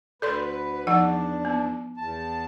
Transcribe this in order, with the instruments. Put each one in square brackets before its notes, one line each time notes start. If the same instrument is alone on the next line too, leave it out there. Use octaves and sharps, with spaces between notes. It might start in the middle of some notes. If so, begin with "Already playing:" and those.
[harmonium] D2 B4 [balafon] A4 D5 C6
[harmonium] E2 D4 [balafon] F3 D#4 F#5
[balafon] B3
[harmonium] E2 A5